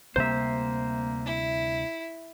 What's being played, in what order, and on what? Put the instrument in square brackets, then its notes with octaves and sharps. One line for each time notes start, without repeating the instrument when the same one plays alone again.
[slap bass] D2 C3 G3 [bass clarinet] A#3 [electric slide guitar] C5 E5
[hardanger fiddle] E4